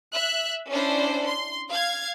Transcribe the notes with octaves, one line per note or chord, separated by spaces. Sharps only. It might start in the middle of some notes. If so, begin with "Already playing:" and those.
E5 F#6
C#4 D4 E4 C5
C6
F5 G#6